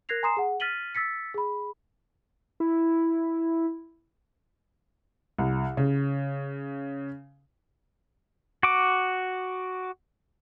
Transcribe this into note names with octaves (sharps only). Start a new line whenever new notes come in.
A#4 F#6 G#6 A#6 C7 F7
G#5 A#5 C6 D#6 C7 E7
G#4 F#5
F6 A6 B6 D#7 F#7 G7
E6 A6 B6 C#7
G#4 B5
E4
C2
C#3
F#4 D6